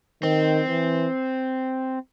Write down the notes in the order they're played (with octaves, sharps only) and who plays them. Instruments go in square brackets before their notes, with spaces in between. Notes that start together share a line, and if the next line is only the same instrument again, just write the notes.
[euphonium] D#3 [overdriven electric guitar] C4
[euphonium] E3